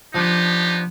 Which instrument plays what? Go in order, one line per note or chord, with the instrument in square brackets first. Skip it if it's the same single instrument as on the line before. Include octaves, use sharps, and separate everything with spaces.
[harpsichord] F3 D4 [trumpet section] B3 D#4 G4